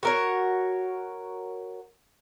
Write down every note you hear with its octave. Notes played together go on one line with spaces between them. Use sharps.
F#4 A#4 C#5